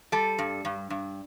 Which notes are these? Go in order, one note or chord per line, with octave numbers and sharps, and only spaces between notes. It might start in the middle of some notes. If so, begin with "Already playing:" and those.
G3 A4
G2
G2
G2